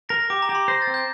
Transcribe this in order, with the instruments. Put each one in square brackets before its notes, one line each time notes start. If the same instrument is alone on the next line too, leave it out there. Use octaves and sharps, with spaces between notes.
[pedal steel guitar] A#4 [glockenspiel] A#6
[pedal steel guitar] G4 [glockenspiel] D6
[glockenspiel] A#5
[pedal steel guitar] G4
[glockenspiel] C6
[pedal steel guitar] C5 [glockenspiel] A#6
[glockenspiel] A6
[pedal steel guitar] C4
[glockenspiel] G6